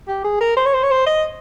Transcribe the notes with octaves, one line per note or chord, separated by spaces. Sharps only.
G4
G#4
A#4
C5
C#5
C5
C#5
C5
D#5